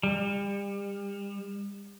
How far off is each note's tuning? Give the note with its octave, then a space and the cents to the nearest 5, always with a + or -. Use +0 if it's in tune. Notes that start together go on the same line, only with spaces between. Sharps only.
G3 +35